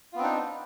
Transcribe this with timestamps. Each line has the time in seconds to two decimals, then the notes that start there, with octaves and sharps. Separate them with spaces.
0.13 F4
0.15 B3
0.18 C4
0.21 D4
0.24 D#4